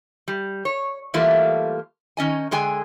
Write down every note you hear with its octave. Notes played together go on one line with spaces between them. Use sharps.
G3
C#5
E3 G3 A3 A#3 F4
D#3 C#4 D#5 G#5
D3 G#3 G#4 G5 G#5